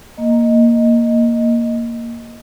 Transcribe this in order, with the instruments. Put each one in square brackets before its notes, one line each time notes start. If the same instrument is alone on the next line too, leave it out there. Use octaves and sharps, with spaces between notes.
[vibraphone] A#3 D#5